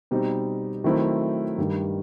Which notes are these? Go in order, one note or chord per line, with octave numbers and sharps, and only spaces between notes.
B2 G3 C4 D#4
D#3 F#3 A3 C4 E4
G2 D#3 G3